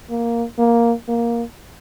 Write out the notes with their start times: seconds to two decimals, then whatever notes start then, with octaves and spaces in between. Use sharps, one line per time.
0.10 A#3
0.59 A#3
1.08 A#3